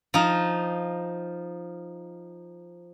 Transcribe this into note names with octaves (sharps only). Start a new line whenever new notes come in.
F3 D#4